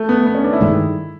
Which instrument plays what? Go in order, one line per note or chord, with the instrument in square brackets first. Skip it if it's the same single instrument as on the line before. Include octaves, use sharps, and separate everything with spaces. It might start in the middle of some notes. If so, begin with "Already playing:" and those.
Already playing: [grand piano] A3
B3
B3
C#4
D4
E4
[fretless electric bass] G2 D#3 G#3